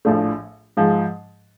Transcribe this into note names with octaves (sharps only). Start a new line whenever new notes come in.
A#1 A2 F3 A3 D4
G#2 F3 G#3